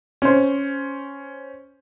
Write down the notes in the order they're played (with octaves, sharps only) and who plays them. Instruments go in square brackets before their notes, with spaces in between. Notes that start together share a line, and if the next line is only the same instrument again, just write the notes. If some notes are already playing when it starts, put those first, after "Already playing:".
[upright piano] C#4 C5